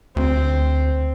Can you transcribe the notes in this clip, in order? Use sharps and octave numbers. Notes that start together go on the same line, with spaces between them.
D2 C4